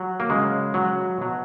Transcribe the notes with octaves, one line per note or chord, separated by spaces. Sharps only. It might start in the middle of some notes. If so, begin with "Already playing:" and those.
Already playing: F#3
A#3
C#3 F#3 G#3
F#3
B2 F#3